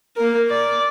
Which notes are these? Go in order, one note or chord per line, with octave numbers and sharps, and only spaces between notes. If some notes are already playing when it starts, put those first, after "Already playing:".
A#3 A#4
D5